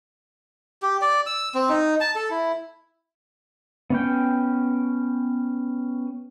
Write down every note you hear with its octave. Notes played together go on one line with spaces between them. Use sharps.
G4
D5
E6
C4
D#4
A5
A4
E4
B3 C#4 G5